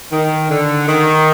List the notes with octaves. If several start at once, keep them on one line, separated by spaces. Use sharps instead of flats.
D#3
D3
D#3